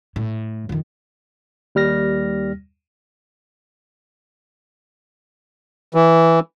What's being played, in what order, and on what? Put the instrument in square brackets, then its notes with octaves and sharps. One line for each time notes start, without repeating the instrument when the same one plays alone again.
[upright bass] A2
F2 D#3
[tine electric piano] D#2 G3 F6 A#6
[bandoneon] E3